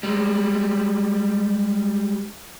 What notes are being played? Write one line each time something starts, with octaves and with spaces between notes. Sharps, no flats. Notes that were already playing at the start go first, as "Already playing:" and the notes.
G3 G#3